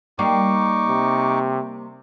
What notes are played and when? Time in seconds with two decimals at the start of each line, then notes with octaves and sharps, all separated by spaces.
0.19 G3 A#3 D#4 C#6 D6
0.88 C3